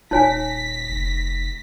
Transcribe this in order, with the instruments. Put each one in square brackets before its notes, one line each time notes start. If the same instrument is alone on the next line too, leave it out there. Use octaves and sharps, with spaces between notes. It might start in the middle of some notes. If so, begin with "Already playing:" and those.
[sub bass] D#1 [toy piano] D#4 C#5 G#5 [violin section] A#6 B6
[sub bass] F1